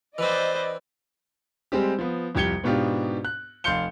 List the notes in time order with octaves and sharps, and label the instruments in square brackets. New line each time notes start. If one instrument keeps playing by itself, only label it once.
[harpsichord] E3 C4 [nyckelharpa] B4 C5 [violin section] D5 D#5
[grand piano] G3 G#3 C4 G4
F3 B3
C2 F2 G4 G#6 C#7 G7
G#2 B2 B3 D4 F4 G4
F#6
F1 F5 C6 G6 C#7 G7